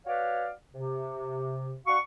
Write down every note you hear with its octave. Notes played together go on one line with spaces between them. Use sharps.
F#4 B4 C#5 D5 F5
C3
D4 F#4 F5 F#5 C#6